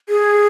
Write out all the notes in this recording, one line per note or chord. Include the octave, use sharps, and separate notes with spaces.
G#4